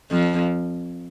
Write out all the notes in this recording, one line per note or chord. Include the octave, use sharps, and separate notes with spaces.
F2 F3